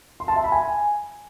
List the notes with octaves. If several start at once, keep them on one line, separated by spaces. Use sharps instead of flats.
C6
A5
E5
B5
G#5